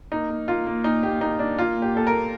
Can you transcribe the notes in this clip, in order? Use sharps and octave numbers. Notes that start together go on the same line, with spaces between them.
A#3 D#4
A#3
A#3 F4
A#3
A#2 D#4
A#2 G4
A#3 D#4
A#3 D4
A#3 F4
A#2
G4
A#2 A4
A#4
A#3